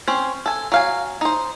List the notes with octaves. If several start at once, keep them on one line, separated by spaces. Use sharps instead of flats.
C4 C#4 C5
A4 G#5
F#3 F5 G#5
D#4 C5